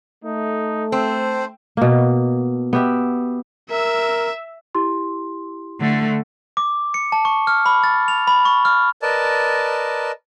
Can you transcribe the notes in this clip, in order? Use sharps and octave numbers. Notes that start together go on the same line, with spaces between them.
A3 D#4
C4 A4 C5
B2 A#3
B3 G4 E5
A#4 E5 E6
E4 G4 C6
D3 A3
D6
C#7
A5
C#6
F6
B5
A6
F7
B5
C#6
F6
A#4 B4 D5 D#5 A5